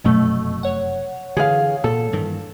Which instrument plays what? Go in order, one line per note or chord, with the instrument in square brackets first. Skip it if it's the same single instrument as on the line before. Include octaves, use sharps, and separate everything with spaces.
[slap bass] F1 F#2 F#3 [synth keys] B2 A3
[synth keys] C#5 F#5
[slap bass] D3 E3 [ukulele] G#4 F5
[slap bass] A#2 [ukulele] A4
[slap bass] G2 D#3 E3